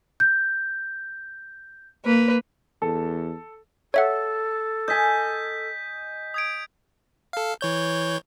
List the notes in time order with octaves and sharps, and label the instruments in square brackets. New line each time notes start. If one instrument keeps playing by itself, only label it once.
[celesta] G6
[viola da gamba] A#3 B4
[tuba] E2 [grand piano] A4
[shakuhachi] A4 [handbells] C#5 E5 F#5
[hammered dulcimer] D#5 G#5 [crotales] G6 B6
[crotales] D#6 G#6 D7
[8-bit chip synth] A4 F5
E3 C#5 G6